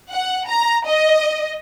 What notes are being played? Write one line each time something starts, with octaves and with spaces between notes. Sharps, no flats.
F#5
A#5
D#5